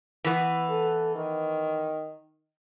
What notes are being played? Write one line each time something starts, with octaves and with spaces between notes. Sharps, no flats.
E3 B3
A4
D#3